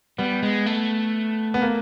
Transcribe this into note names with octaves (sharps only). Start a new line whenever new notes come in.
G3 B3
G#3
A3
B3
A#3